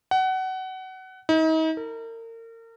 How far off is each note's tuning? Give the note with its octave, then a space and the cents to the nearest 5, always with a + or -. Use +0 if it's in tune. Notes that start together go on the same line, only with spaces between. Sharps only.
F#5 +25
D#4 +40
A#4 -35